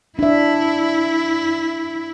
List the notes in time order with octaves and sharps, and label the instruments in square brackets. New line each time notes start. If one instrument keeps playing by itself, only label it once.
[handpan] D4 E5 [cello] E4